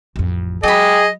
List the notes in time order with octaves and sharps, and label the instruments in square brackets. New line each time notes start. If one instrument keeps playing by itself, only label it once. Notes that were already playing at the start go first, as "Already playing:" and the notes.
[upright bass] A1 F2
[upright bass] F#3 [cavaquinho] G4 B5 [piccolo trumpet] G#4 [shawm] D#5